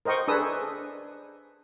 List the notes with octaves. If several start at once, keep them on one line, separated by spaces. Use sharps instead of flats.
A#4 C5 D#5 G5 C#6
D4 G#4 A4 B4 D#6 E6